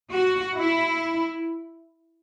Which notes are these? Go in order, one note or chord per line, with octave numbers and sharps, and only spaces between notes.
F#4
E4